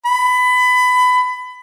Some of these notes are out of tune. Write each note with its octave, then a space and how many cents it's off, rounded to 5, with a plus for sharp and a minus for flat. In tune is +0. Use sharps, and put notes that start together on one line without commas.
B5 +20